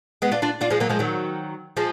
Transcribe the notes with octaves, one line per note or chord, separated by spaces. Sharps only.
G#3 B3
D4 F4
D4 F4
D4 F4
F3 G#3
F#3 A#3
F3 G#3
D#3 F#3
F3 G#3